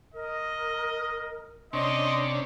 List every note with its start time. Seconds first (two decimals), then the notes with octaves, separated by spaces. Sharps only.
0.14 A#4 D#5
1.73 C3 C#4 D4 D#5 C6